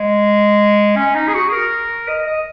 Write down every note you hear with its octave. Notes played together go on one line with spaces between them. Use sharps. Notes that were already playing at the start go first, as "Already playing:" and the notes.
Already playing: G#3
C#4
D#4
G#4
F#4
G#4
A#4
D#5
D#5